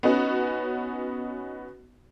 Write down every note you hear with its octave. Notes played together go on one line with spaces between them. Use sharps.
B3 C#4 D#4 F#4